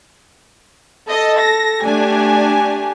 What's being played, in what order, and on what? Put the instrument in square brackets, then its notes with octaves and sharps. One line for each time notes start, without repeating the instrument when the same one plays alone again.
[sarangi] A4 [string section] D#5
[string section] A#6
[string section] A3 D4 G#5 [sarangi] G4